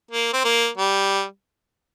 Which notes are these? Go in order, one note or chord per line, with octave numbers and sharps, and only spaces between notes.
A#3
C4
A#3
G3